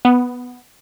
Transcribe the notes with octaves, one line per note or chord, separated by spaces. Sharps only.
B3